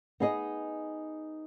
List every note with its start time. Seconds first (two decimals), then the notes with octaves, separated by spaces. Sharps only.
0.20 B3 D#4 G#4 D#5